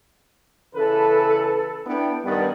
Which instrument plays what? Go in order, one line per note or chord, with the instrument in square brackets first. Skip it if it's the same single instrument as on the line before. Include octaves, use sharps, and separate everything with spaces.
[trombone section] C#3 E3 B4 [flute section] A4
[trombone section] B3 D4 E4 [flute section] G5
[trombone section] G2 D#3 B3 [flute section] D5